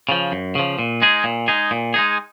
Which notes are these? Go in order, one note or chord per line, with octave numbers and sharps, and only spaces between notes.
C#3 F3
F#2
C#3 F3
A#2
G#3 D#4 G#4
A#2
G#3 D#4 G#4
A#2
G#3 D#4 G#4